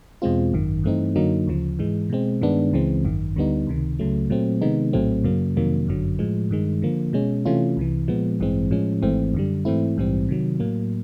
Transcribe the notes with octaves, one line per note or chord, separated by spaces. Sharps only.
E2 B2 G#3 C4 F4
G#1 F#2 D#3
G2 E3 A3 C4 D#4
F#2 D3 F#3 A#3 D#4
D2 C#3 F3
G#2 E3 G#3
B2 G#3 C4
G2 D#3 G#3 B3 D4
C#2 C#3 E3 G#3 C4
G#1 F#2 D#3
D2 D3 G3 B3 D#4
C#2 C3 D#3
C#2 C#3 F#3 A3
A#2 F#3 A3 C4
C3 D#3 G#3 B3 D#4
A#1 A2 F#3 A3 C4
F#2 C#3 F#3 A#3
F2 C3 D#3 F#3 A#3
G1 F#2 D3 F#3
A2 F3 G#3
G2 D#3 G#3
D3 F3 A#3
B2 G#3 C#4
C3 E3 A3 C#4 F4
C2 C3 E3
A#2 F3 G#3 B3
A1 G2 E3 G#3 C4
A2 F3 G#3 C#4
G#1 G#2 E3 A3 C4
F#2 D3 G3
G#2 E3 A3 C4 E4
A#1 G#2 E3 G3 C4
C3 D#3 F#3
A2 F#3 A#3